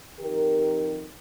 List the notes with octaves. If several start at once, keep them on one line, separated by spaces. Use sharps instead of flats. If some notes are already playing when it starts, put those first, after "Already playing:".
F2 D#3 G4 A#4